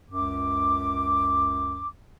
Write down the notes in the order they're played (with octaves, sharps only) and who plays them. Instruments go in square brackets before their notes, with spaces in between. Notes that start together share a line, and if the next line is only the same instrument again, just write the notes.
[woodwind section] C#2 F#2 D6